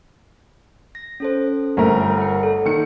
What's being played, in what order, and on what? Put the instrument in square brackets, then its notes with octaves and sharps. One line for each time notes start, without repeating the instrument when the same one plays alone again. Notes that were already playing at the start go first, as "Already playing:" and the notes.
[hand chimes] A#6
C#4 A4 C5
[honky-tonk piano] G1 A3 A#4 [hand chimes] F#5 A#5
[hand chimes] F#5 C#7
A4 D5
[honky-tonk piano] D#3 C#7 [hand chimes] A#3